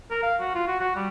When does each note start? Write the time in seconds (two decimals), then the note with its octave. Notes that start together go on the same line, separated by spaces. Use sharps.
0.10 A#4
0.22 F5
0.40 F#4
0.55 F4
0.67 F#4
0.80 F#4
0.96 G3